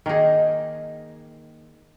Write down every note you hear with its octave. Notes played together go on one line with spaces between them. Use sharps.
D#3 A#3 D#4 G#4